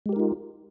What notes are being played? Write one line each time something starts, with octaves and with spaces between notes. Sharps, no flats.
G#3 D#4 F4 G4 A#4